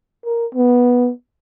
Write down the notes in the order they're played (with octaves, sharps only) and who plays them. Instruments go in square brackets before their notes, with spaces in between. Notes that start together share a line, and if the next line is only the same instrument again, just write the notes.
[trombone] A#4
B3